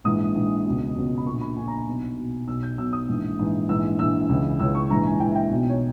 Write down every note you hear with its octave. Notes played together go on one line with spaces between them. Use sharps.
A#1 G#2 E3 D#6
A#1 G#2 E3
C#2 B2
C#2 B2
B5
A#1 A#2 C#6
B5
A#1 A#2 G#5
A#5
G#5
B1 B2
B1 B2
B1 B2 E6
G6
B1 B2 E6
D#6
A#1 G#2 E3
A#1 G#2 E3
A#1 G#2 E3 E6
A#1 G#2 E3 E6
C#2 C#3 E3
C#2 C#3 E3 E6
C#6
A#1 G#2 E3 A#5
G#5
A#1 G#2 E3 G5
E5
G5
B1 B2
C#5